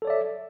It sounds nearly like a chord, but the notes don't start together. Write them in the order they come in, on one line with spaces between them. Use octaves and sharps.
A4 C#5 D5 E5